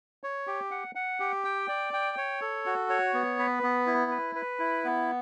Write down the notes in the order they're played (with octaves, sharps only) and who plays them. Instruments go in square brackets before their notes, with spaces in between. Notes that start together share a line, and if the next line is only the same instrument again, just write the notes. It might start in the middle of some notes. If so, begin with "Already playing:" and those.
[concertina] C#5
G4
F#5
F#5
G4
G5
D5
G5
C#5
A4
F#4
C#5
B3
B4
B3
E4
B4
B4
E4
B3